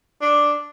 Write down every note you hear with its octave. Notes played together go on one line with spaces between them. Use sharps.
D4